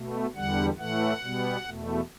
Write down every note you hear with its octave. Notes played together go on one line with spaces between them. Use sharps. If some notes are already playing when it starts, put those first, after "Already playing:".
Already playing: B2 A3
E2 D3 G3 F#5
A2 E3 A3 F#5
B2 G3 B3
E2 B2 A3